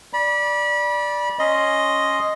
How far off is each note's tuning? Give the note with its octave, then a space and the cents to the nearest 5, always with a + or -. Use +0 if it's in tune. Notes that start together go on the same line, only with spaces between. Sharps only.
D5 +0 B5 -30
C#4 +0 D#5 +0 C6 +0